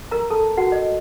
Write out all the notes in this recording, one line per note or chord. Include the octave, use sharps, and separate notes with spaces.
A#4 A#5
A4 A5
F#4 F#5
D#5